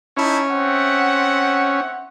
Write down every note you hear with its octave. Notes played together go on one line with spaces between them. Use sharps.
C#4 D#4 E4 A5
C4 E5 F#5